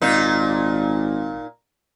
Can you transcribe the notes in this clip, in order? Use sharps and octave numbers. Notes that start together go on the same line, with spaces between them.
G#1 A#2 D#4